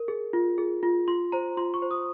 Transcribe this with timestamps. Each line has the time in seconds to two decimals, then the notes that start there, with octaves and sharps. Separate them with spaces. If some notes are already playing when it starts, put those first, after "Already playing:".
Already playing: A#4
0.08 G#4
0.33 F4
0.58 G#4
0.83 F4
1.08 F4 C6
1.32 C5 A#5
1.57 F4 C6
1.74 C#6
1.82 C5
1.91 D#6